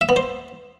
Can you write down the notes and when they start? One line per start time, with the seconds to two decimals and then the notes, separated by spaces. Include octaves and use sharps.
0.01 E5
0.09 B3
0.16 C5